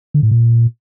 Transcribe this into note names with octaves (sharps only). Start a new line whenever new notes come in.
D3
A2
A#2